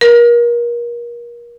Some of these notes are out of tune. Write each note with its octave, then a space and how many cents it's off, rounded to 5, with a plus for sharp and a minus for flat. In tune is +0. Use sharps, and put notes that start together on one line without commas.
A#4 +30